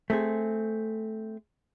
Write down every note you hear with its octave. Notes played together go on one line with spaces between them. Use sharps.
A3 C4 G#4